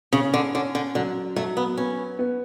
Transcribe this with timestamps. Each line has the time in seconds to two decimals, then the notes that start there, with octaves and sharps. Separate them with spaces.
0.13 C#3 C#4
0.34 D3
0.55 D3 C#4
0.75 D3
0.95 D3 F#3
1.36 F#3 A3
1.57 B3
1.77 B3 C#4
2.19 B3